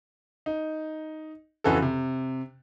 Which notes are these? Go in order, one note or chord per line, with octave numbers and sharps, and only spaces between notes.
D#4
F2 C#3 E3 F#4 A4
C3